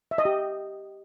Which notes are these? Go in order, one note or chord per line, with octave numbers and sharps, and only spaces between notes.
E5
D#5
G4